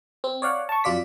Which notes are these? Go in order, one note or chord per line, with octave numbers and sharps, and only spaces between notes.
C4
C#5 D5 F5 F#5
A5 C#6
F2 F#3 F4 D5 B6